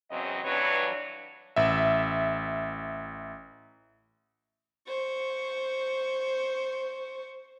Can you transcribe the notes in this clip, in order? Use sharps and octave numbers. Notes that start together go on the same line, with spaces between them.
E2 C#3 F#3 C4 D#5
G2 E3 F#3 D4 B4 C#5
A1 E5
C5 C#6